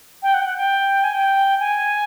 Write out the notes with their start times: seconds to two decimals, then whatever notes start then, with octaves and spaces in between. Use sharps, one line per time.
0.23 G5
0.34 F#5
0.41 G5
0.45 F#5
0.57 G5
1.04 G#5
1.14 G5
1.60 G#5